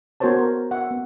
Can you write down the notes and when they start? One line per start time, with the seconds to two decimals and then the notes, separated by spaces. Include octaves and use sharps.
0.20 B3 F#4 A#4 C5 C#5 A5
0.39 A#4
0.71 E5 F#5
0.91 B3